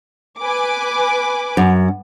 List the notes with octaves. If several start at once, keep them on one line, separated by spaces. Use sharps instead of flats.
B4 G#5 D6
F#2